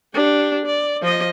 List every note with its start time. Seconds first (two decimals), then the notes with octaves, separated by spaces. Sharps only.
0.14 D4 G4
0.66 D5
1.02 F3 D#5